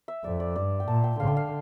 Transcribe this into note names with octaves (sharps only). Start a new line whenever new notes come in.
E5
F2 D5
D5
G2 D5
G5
A#2 A5
G5
D3 F5
G5
F5